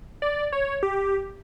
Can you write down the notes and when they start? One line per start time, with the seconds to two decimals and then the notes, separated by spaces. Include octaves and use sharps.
0.22 D5
0.52 C#5
0.83 G4